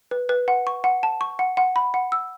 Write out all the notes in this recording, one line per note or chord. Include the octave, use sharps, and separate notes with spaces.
B4
B4
F#5
C#6
F#5
A5
C#6
F#5
F#5
B5
F#5
E6